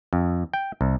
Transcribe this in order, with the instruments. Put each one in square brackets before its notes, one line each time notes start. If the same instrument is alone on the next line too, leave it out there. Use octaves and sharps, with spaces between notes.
[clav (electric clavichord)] F2
G5
C2